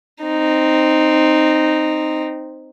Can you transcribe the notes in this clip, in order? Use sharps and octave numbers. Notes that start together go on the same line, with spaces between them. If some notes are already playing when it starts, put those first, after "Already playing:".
C4 D#4